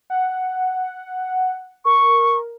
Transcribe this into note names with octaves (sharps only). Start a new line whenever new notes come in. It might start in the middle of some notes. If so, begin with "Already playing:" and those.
F#5
A#4 C#6